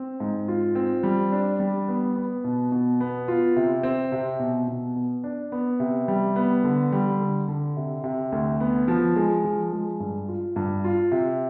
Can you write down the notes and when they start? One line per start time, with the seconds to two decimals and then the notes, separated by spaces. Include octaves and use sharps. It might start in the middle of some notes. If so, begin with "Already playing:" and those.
Already playing: C4
0.20 G#2
0.48 F4
0.75 C4
1.03 G3
1.32 D4
1.60 G3
1.88 B3
2.16 B3
2.44 B2
2.72 B2
3.01 B3
3.28 F4
3.56 C3
3.83 C4
4.12 C3
4.39 B2
4.68 B2
4.96 B3
5.24 D4
5.52 B3
5.80 C3
6.08 G3
6.36 B3
6.64 D3
6.92 G3
7.20 D3
7.48 D3
7.77 C3
8.04 C3
8.32 D2
8.60 B3
8.88 F3
9.16 G#3
9.44 F3
9.72 G#3
10.00 G2
10.28 F4
10.56 G2
10.84 F4
11.12 C3